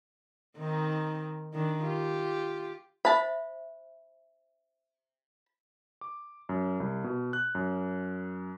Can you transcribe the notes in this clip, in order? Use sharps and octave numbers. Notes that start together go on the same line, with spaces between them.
D#3 C4 D#4
D#3 D4
F4 G4
C5 E5 A5 B5
D6
F#2
C2
B2
F#6
F#2